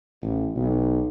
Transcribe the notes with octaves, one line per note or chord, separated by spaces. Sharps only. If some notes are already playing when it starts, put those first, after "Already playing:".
A1
B1